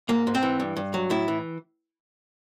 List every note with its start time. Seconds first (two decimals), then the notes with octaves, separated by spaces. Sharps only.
0.09 G#2 A#3
0.27 G#2
0.35 C4
0.43 E3
0.60 G2
0.76 G2
0.94 F#3
1.10 A2 E4
1.28 E3